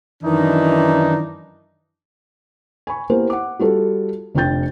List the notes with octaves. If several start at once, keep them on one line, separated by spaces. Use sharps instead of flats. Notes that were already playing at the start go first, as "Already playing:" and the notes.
F#2 D#3 E3 D4 D#4
G#5 B5 C#6
A#3 B3 E4 G4 A#4 C5
F#5 D6
G3 F4 F#4 A4
F1 D4 F4 G5 G6 A6